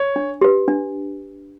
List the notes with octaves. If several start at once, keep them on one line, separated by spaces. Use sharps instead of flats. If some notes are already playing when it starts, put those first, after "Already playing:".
Already playing: C#5
D4
G4 B4
D4